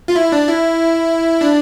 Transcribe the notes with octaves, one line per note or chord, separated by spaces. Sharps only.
F4
E4
D4
E4
D4